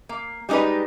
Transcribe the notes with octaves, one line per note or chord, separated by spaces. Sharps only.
A#3
G3 G#3 D#4 G4 B4